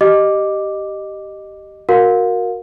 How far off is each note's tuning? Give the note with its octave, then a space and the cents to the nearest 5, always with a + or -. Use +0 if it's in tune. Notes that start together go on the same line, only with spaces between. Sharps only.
G4 -10 D#5 -15 D6 +0
F#4 -15 A#4 +0 F5 +35